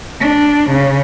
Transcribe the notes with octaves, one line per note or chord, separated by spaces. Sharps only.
D4
C#3